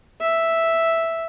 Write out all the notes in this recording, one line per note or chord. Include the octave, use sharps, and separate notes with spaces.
E5